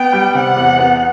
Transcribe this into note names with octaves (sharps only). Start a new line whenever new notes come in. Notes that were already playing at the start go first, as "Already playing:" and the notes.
Already playing: B3 G5
G3
C3 F#5
E2
B3